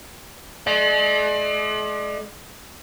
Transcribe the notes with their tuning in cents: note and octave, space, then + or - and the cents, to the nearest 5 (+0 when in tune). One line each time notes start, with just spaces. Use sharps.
G#3 +45 D5 +30